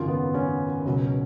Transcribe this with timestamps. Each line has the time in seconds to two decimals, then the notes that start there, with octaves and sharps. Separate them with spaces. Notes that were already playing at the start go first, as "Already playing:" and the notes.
Already playing: G#1 F#2 C#3 F4
0.08 B3
0.34 C#4
0.85 C#2 B2 F#3